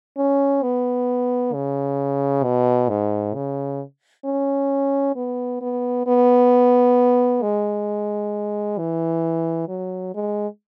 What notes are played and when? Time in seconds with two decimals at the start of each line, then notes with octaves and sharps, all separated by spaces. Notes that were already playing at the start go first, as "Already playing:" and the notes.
0.17 C#4
0.63 B3
1.54 C#3
2.44 B2
2.89 G#2
3.35 C#3
4.26 C#4
5.16 B3
5.62 B3
6.07 B3
7.43 G#3
8.78 E3
9.69 F#3
10.15 G#3